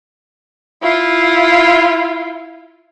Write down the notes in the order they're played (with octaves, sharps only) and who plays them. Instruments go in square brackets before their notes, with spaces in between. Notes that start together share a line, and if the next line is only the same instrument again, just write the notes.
[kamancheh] E4 F4